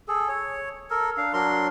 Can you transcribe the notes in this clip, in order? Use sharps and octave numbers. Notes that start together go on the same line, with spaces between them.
G#4 A4
C#5
A4 A#4
D4 F5
F#3 D4 A#4 C6